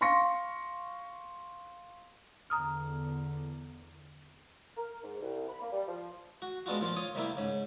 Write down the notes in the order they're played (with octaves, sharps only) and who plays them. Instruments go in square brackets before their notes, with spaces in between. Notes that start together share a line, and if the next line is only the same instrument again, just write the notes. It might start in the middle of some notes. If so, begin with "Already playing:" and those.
[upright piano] F5 C6 C#6 A#6 C#7
[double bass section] E2 D3 [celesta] A#5 D#6 F6
[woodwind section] A#4
G#2
C2
B5
A#3
G3
F3
[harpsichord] F#4
G#3 B3 D4 F4 F#4
A#2 F3 F4
F4 C#5 D#6
C3 G3 A#3 E4
G#2 C#3